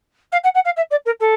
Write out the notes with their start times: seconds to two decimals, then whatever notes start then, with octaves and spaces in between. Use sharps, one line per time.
0.32 F5
0.43 F#5
0.54 F#5
0.65 F5
0.76 E5
0.90 D5
1.05 A#4
1.20 A4